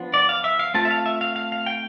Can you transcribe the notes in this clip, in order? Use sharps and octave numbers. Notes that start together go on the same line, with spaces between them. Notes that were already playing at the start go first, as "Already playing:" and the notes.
Already playing: F3 B3 D4 F4
D5
F5
E5
F5
A3 C4 F4 A5
E5
F5
E5
F5
F5
F5
G5